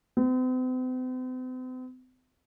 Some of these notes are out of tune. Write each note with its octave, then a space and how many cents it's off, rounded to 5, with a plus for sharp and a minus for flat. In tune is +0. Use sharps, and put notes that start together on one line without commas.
C4 -45